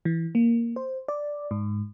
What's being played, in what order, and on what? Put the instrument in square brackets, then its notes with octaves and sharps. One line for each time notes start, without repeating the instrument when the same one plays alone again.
[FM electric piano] E3
A#3
C5
D5
G#2